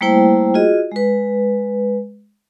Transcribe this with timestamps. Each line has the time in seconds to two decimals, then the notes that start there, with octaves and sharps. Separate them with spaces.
0.01 G3 A3 A#3 E4 C5 G5
0.54 F4 F#4 G#4 D#5
0.92 G#3 B4